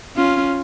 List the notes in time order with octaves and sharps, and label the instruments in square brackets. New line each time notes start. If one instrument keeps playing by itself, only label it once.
[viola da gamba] C#4 F4